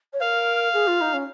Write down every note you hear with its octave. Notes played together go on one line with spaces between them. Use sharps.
C#5
A#4 F5
G#4
F4
D#4
C#4